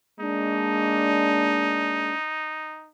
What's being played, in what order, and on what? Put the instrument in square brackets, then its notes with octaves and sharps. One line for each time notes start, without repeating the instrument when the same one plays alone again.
[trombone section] G#3 A#3 D4 [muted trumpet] D#4